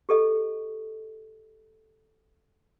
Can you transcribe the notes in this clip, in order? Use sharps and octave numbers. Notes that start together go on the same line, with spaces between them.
G4 A4 D#5